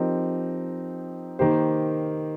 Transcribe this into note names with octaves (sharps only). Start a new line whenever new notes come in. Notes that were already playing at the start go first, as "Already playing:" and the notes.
Already playing: F3 C4 D#4 G4 A#4
D#3 A#3 G4 C5